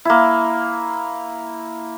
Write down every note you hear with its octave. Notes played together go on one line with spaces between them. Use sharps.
A#3 E4